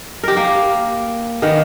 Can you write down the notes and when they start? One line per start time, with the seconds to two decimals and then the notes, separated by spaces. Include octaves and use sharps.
0.23 G4 A#4
0.37 A#3
1.42 D#3 A#3 B3